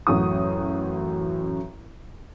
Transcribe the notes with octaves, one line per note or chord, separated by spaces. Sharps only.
A1 F#2 F#4 D#6